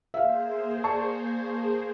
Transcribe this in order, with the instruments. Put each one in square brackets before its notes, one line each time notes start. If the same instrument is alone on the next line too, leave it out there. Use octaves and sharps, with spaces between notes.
[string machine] A#3 G#4 C5 [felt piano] E5 F5
[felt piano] D5 A5 C#6